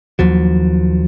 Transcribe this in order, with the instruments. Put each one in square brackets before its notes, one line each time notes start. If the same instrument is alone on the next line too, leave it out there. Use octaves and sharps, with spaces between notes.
[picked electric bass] D#2 F3 F#3